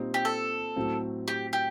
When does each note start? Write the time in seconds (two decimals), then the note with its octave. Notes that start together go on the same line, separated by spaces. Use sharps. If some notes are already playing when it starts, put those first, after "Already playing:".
Already playing: A#2 G3 C4 D#4
0.14 G4
0.25 A4
0.76 A2 F#3 C4
1.28 G4
1.53 G4